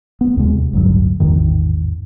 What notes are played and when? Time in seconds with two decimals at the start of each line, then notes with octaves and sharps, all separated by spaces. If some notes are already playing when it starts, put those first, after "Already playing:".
0.21 B3
0.37 D#2 C3 G#3
0.73 A1 D2 G2 F#3
1.20 A1 E2 G#2 D#3